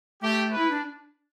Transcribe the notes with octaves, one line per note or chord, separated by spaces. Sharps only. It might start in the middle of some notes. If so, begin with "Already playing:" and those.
A3 G4
B4
E4
D4